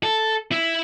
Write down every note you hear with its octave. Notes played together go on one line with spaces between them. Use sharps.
A4
E4